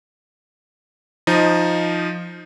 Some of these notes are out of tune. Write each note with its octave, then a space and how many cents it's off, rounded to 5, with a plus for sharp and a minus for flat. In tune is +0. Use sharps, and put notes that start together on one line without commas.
F3 +0 D#4 +5 D#5 -5